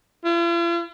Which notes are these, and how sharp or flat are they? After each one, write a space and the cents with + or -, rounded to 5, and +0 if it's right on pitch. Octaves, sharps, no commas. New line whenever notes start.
F4 -45